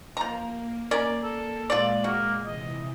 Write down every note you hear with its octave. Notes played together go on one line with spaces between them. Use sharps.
F3 A#3 A#5
C#4 A#4 D5
A4
A#2 G#3 F4 D5
A#3 F#4
C3 E3 D#5